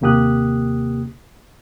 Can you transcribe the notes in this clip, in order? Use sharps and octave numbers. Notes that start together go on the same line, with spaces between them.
D#2 C3 A#3 G4 D#6 F#6